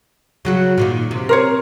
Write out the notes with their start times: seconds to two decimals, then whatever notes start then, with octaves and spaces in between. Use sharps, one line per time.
0.45 C#3 F#3 F#4
0.78 A#2 D#3 A#3
1.11 C3
1.29 A#4 C5 C#5